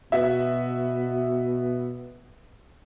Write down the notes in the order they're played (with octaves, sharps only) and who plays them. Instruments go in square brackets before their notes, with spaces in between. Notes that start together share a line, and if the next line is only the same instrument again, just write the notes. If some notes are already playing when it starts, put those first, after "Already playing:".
[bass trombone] B2 [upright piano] B3 F#4 E5